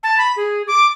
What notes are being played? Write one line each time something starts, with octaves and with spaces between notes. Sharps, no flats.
A5
B5
G#4
D6